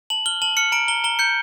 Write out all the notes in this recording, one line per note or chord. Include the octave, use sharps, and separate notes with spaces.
A5 F#7
F6 G7
A5 F#7
F6 C#7
A#5 D7
A#5 G7
A#5 G7
G6 C#7